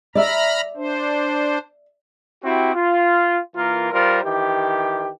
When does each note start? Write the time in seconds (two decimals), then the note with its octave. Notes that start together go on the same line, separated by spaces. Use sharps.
0.15 D5 E5 A#5 B5 F6
0.76 D4 C5
2.43 C4 E4 F#4 G4
2.75 F4
3.56 E3 A#3 F4 A#4
3.92 G3 F4 A#4 C5
4.24 D#3 E3 G4